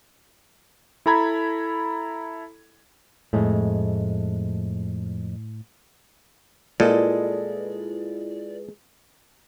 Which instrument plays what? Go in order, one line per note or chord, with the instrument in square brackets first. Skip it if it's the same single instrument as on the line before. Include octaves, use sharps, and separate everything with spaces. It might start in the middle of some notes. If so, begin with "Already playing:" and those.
[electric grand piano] E4 A4 A#5 B5 G#6
[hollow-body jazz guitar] F2 G#3 A3 [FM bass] A2
[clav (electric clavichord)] A#2 [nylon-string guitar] G#3 A4 D#5 [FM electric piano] E4 F4 B4 [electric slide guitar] D5